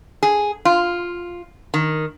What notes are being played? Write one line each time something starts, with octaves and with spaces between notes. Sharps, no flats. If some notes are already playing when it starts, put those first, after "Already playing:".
G#4
F4
D#3